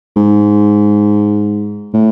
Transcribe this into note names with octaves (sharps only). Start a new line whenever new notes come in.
G#2
A2